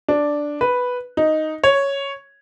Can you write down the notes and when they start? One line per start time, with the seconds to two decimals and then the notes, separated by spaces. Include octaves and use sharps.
0.08 D4
0.61 B4
1.17 D#4
1.64 C#5